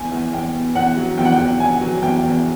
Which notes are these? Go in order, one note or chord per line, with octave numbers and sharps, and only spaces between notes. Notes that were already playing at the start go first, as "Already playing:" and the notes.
Already playing: E2 G#5
E2
E2 G5
B2
E2 F#5
F#3
E2 G5
F#5
G5
E2
B2 G#5
F#3
E2 G5
E2